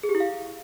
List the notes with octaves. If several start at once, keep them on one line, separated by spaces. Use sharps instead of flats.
G#4
G4
E4
F5